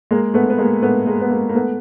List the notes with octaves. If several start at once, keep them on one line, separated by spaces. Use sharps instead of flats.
G#3 A#3
A3 B3
B3
G#3 A#3
A3 B3
G#3 A#3
B3
G#3 A#3
A#3
A3 B3